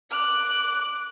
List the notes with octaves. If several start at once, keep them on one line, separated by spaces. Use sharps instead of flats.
D6 F#6